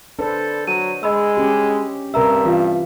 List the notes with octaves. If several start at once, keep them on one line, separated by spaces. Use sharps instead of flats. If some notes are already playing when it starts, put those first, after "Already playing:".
D4 A4 B4 C5
F#3 D#7
G#3 D#5 B5 E6
C#4 G4
G2 C3 A#4 E5 A#5 E6
E3 F4 F5